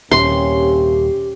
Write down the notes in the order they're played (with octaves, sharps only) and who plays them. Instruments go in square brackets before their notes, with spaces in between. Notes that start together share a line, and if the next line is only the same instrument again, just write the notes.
[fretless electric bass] D#1 [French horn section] C3 A#3 C#4 [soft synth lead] G4 [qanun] C6